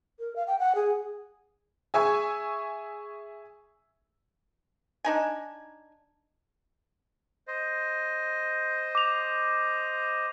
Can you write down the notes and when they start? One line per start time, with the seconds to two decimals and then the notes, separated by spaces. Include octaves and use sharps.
0.19 A#4
0.36 F5
0.47 G5
0.59 F#5
0.75 G#4
1.94 G#4 E5 G#5 C#6
5.04 D4 D#4 G#5
7.48 C5 D#5
8.95 D6 F7